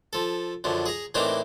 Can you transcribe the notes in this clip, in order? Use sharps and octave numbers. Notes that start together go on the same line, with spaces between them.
F3 A4
F#2 D3 F3
G#4 A#5
A2 E3 A#3 C4 D4 D#4